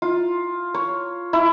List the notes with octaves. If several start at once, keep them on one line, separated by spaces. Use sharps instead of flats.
F4
C#5
E4